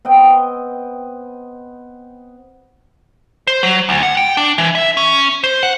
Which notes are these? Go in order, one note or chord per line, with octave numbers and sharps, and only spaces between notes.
B3 C4 D#5 G5
C5
F#3
D2
F#5
G5
D4
E3
E5
C#4
C5
F#5